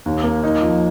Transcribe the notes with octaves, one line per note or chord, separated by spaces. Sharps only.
D#2
A#3
D#4
F3